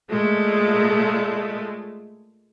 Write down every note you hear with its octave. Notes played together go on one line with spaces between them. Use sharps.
A#2 G#3 A3